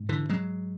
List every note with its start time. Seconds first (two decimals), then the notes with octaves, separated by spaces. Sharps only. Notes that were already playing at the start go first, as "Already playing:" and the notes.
Already playing: G#2
0.09 D3 E3
0.29 F#3 G#3